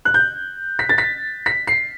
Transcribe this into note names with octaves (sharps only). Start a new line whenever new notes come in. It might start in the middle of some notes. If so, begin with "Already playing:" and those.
F#6
G6
B6
A6
B6
B6
C7